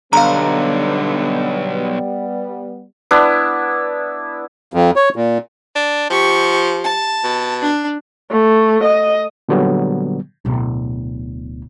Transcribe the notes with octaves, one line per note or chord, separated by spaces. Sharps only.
B1 D3 G3 B3 F5 A#5
B3 D4 E4
F2
C#5
A#2
D4
F3 G4 C#6
A5
B2
D4
A3
D#5
A#2 D3 F#3 G3 B3
D1 B2